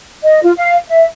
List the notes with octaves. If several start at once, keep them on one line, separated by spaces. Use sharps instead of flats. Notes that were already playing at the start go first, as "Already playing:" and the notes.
D#5
F4
F5
E5